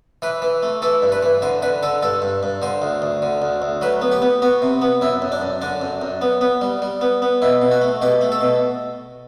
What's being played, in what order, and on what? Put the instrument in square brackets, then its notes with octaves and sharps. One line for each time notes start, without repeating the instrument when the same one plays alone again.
[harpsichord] E3 B4
E3
A3
E3 A4
G2
B4
E3
D3 C5
D3 B4
D3 A4
G2 A4
G2
G2
D3 C5
D2
D2
D3
D2
D2
F#3 B4
B3
G4
B3
B3 F#4
C3
B3
F#2 E4
F#2
D4
F#2
D3 D4
F#2
F#2
B3
B3
G3
G3
B3
B3
B2 E4
B2
F#4
A3
B2 G4
A3
A4
B2